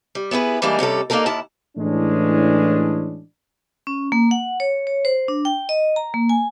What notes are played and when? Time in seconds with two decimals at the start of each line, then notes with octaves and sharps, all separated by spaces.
0.15 G3
0.31 B3 E4 G#4 B4
0.62 E3 G3 G#3 A#3 D4 D#4
0.79 C3 G3 C#4 A4
1.10 A#3 D4 D#4 A4 A#4
1.26 D#2 D#3 E4 A5
1.77 A2 E3 G#3 C#4 D4
3.87 C#4
4.12 A#3
4.31 F#5
4.60 C#5
4.87 C#5
5.05 C5
5.28 D4
5.45 G5
5.69 D#5
5.96 A#5
6.14 A#3
6.29 G#5